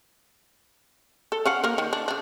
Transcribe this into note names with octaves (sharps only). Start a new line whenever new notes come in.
A4
C#4 F5 F#5
A#3 A#4
D#3
D4
C#3 D4